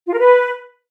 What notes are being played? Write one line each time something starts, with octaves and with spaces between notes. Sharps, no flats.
F4
A#4
B4